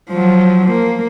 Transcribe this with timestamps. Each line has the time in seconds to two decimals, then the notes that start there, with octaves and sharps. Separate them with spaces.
0.11 F3 F#3
0.72 A#3